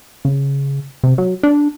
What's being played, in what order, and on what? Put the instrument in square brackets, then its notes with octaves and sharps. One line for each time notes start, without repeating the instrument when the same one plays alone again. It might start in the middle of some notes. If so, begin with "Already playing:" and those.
[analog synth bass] C#3
C3
F#3
D4